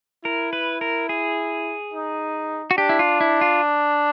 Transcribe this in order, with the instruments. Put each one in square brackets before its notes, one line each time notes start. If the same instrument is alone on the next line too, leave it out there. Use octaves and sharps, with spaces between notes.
[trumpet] E4 [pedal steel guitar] A#4
[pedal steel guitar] B4
A#4
G#4
[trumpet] D#4
[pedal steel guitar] F#4
[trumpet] D4 [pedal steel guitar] G4
[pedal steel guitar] E4
F4
E4
F4